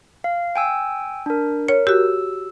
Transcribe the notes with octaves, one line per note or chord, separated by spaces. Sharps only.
F5
G5 G#5 E6
D4 A#4
A#4 C#5
F#4 G4 E6